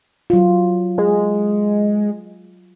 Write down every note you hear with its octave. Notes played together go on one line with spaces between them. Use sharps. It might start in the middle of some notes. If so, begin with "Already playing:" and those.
F#3 F4
G#3